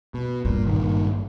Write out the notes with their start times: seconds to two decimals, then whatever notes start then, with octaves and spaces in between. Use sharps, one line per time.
0.14 B2
0.45 G2 A#2
0.67 G#1 A#2 D#3